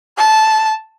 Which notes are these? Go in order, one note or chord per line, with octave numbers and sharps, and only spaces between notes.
A5